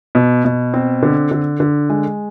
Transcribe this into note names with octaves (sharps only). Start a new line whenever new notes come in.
B2
B2
C4
D3
D3
D3
G#3